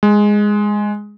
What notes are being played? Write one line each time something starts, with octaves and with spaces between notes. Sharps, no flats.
G#3